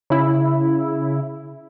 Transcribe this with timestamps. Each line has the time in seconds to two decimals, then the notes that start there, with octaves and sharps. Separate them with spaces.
0.10 C#3 E4